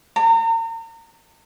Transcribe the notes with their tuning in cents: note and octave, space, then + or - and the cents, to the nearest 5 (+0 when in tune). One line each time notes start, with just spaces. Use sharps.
A#5 -40